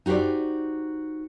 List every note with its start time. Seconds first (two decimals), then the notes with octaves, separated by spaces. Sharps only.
0.06 D#4 F#4 G4 C5 D5